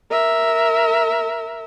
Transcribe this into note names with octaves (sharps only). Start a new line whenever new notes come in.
A#4 E5